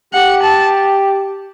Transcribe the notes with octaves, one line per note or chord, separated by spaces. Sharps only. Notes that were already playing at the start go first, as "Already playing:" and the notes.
G4 F#5
A5